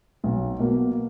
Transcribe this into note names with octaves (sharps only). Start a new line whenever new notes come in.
B1
B2 A#3